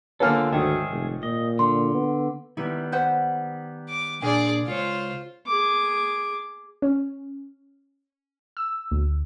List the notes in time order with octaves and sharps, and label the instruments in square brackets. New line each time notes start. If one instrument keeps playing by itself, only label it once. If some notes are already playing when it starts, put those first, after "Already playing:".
[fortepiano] D3 A#3 B3 [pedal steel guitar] F4 A4 [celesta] C#5 G#5 F6
[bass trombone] D2 [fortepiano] G#2 D#3 [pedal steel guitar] G#4 E5
[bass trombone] F1
[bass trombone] A#2 [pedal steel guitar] D#5
[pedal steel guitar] D3 [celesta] C6
[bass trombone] B3
[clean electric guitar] D#3 G3 B3 [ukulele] E4
[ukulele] B4 C5 F#5
[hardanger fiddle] D6
[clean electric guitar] A#2 D4 A#4 [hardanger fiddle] G#4 D5 [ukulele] G#5
[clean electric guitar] C#2 C#5 [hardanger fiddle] F4 C5
[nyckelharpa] G#4 D6
[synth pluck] C#4
E6
D2